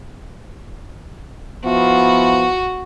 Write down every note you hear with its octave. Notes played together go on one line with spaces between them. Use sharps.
F3 B3 E4 F#4